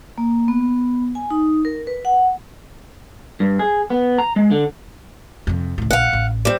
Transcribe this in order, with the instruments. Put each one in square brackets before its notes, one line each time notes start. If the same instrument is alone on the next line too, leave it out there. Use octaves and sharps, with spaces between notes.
[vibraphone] A#3
B3
G#5
D#4
A#4
B4
F#5
[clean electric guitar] G2
G#4
B3
A#5
G#3
D3
[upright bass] F2 C3
C#2 A2
[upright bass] A#1 [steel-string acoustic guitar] F5 F#5
[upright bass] A1
[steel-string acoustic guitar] G3 C4